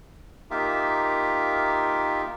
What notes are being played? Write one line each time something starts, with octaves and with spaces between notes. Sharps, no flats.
A#3 D#4 F4 G4 A#4 E5